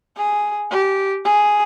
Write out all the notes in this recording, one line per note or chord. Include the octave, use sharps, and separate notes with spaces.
G#4
G4
G#4